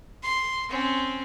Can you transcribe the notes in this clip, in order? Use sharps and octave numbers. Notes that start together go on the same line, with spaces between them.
C6
C4 C#4